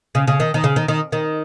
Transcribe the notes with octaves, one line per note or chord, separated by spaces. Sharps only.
C#3
C#3
D#3
D#3
C#3
D#3
D#3
D#3